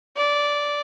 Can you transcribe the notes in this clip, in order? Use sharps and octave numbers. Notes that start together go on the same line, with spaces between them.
D5